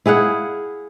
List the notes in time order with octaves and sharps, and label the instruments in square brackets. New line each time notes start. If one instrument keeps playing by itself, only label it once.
[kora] E4 G#4 F5 F#5